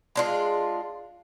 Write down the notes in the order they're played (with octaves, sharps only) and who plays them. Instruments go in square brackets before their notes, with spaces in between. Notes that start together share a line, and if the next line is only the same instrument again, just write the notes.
[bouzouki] G#3 D4 F4